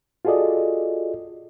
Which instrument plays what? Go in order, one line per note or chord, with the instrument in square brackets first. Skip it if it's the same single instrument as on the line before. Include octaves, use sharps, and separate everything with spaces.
[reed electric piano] F4 F#4 G#4 A4 D5 D#5